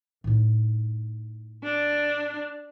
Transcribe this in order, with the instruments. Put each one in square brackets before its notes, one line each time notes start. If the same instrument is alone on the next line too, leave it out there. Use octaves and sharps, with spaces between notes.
[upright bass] A2 D#4
[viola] D4